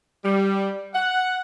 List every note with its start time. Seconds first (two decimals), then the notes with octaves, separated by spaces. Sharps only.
0.24 G3
0.94 F#5